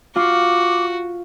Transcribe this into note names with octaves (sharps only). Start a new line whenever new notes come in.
F4 F#4 D6